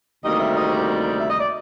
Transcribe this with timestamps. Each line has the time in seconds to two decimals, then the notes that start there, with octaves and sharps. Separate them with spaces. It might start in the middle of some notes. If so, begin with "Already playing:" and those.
0.24 D2 C3 D#3 G3 A#3 D#5
0.39 E5
0.56 D#5
0.70 D5
1.19 E5
1.29 D#5
1.39 D5